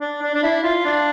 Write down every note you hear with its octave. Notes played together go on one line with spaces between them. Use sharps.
D4
D4
D4
E4
F4
D4